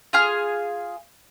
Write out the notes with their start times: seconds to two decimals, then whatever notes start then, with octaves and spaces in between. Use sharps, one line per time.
0.13 F4 G#4 F6